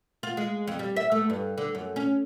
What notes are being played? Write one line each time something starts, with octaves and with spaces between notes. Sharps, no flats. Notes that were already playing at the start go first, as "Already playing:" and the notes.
F4
G#3
F2
G3
E5
A3
G2
D3
F#2
C#4